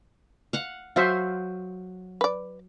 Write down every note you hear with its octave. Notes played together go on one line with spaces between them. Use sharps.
F5 F#5
F#3 F#4 C5 E5 F5
B4 D5